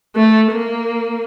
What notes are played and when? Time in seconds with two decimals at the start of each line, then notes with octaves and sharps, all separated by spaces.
0.16 A3
0.52 A#3